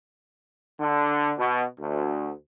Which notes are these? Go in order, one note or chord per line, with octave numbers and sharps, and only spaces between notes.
D3
B2
D2